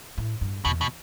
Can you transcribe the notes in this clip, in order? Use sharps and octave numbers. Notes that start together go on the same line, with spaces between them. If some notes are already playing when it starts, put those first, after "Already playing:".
A2
G2
E2 B2
B2